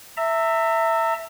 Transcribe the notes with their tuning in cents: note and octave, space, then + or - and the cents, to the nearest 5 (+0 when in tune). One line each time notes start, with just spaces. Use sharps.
E5 +0 A#5 -40